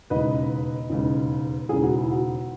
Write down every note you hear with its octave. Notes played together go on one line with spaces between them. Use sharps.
E1 D#2 C#3 B4 D#5
E1 D#2 C#3
E1 D#2 C#3 G#4
F#4
E4
F#4